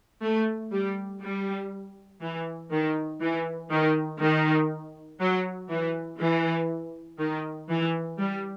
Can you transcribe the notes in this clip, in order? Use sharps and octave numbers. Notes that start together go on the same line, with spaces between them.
A3
G3
G3
E3
D#3
E3
D#3
D#3
F#3
E3
E3
D#3
E3
G3